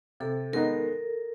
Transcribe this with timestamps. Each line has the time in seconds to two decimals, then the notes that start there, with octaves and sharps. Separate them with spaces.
0.20 C3 A4
0.53 D#3 G#3 B3 D#4 A#4